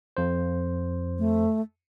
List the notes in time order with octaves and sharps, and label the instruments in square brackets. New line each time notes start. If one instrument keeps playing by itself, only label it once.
[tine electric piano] F2 C5
[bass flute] A3